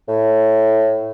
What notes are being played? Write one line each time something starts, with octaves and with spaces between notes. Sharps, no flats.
A2